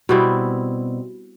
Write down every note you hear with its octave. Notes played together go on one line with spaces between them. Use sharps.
B2 G3 C4 E4